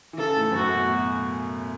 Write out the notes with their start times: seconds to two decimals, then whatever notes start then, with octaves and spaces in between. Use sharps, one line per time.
0.13 E3
0.18 C#3 A4
0.37 A2
0.52 F#2
0.55 A2 F#4
0.74 B2